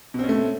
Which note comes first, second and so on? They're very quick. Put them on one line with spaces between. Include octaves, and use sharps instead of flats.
B2 C4 C#4 A3